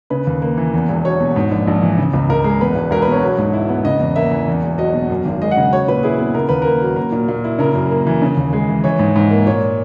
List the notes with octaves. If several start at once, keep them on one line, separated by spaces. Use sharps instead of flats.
C#3 B4
D#2
A#3
E3
E2
E1
F#3 C#5
B2
G#2
A#1
A#1
E3
C#3
C#2
C#2 A#4
G#3
E2 B4
E1
E1 A#4
B4
B2 C#5
F#3
G#2
E4
B3
C#3 D#5
E2
A#3 E5
E3
E2
E1
F#3 D#5
B2
F#2
G#1
G#3 D#5
F#5
C#3
F#3 C#5
A#2 B4
E4 G#4
B3
C#3 A#4
D#2 B4
A#3 A#4
F#3
A#3 A#4
A#2
A#2
E4
C#3 A#4
F#2
A#3
E3
C#3
D#2
G#3
E3
E3 C#5
G#2
G#2
A#3
A#2 C#5